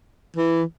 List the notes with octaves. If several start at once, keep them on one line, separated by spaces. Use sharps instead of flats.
E3